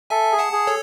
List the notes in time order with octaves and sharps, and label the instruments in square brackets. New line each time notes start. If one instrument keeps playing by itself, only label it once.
[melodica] A4 [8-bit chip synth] E5 G#5
[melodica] G#4
[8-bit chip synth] F#5 A5
[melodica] G#4
[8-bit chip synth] A4 C#5